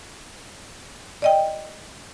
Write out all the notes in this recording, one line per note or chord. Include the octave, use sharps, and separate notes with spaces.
D5 D#5 G5